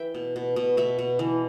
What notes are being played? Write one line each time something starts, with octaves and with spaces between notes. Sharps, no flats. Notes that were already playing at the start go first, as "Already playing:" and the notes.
Already playing: E3 E5 G5
B2
B2
B2
B2 E5
B2
E3